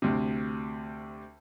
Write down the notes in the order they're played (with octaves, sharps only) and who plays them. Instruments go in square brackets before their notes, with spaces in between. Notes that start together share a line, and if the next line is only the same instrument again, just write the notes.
[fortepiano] D2 C3